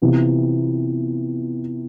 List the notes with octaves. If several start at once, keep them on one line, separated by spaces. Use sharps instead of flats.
C3 E3 B3 F4